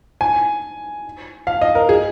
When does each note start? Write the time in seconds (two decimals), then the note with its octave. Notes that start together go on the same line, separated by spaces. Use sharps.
0.21 G#5
1.47 F5
1.61 D#5
1.75 A#4
1.89 G#4